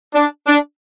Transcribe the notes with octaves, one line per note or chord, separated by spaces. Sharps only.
D4
D4